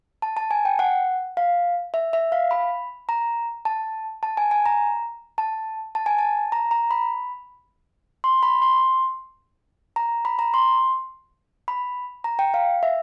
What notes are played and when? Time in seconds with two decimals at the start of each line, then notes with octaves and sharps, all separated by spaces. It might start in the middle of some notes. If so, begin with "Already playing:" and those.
0.22 A5
0.37 A5
0.51 G#5
0.65 G5
0.79 F#5
1.37 F5
1.94 E5
2.13 E5
2.32 F5
2.51 B5
3.09 A#5
3.65 A5
4.23 A5
4.37 G#5
4.51 G#5
4.66 A#5
5.38 A5
5.95 A5
6.06 G#5
6.18 A5
6.52 A#5
6.71 A#5
6.91 B5
8.24 C6
8.43 B5
8.62 C6
9.96 A#5
10.25 B5
10.39 A#5
10.54 C6
11.68 B5
12.24 A#5
12.39 G5
12.54 F5
12.83 E5